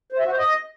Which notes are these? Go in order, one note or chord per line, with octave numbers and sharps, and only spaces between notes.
C5
E5
F#4
C5
D#5